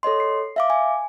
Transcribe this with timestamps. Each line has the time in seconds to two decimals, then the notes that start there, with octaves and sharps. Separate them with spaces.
0.03 A4 C#5 D#5 C6
0.20 C7
0.56 E5 F5 D6
0.70 G#5